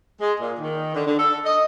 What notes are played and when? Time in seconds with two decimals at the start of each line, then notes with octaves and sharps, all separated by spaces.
0.19 G#3
0.40 A#2
0.58 D#3
0.94 D3
1.05 D3
1.19 A4
1.44 D#5